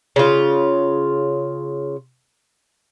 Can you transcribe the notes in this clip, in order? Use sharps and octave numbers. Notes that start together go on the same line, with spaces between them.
C#3 F4